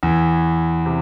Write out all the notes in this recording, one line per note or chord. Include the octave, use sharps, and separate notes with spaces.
E2 E3
C3